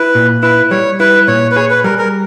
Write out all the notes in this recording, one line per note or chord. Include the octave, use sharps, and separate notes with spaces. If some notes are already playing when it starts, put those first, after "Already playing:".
Already playing: E4 B4
A#2
E4 B4
G3 C#5
E4 B4
A#2 C#5
B4
G#4 C#5
B4
G3 A#4
A#4